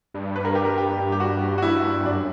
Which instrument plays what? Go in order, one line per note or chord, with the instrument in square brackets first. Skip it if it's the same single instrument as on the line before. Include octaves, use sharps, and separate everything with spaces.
[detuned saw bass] G2
[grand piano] B4
A#4
G4
A#4
G4
G4
F#4
F#4
E4
[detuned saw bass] F#2 [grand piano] D4